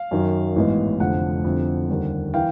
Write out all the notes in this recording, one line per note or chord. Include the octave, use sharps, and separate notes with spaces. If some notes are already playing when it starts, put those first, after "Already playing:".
Already playing: F5
F#2 D#3 F#3
A1 G#2 E3 G#3 B3
F1 F2 D3 F#5
F2 D3 G3 C4 E4
D#2 D3 G3 A#3 D4
E3 F5 G5